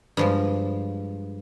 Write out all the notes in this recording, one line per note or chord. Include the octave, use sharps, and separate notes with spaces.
G2 F3 G#3